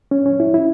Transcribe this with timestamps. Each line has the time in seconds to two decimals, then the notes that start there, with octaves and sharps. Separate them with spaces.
0.11 C#4
0.26 C#4
0.40 E4
0.54 E4